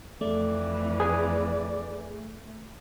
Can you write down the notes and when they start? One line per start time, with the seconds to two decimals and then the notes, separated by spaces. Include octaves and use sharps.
0.21 F2 E3 A3 D5
1.00 G#4 B4 G#5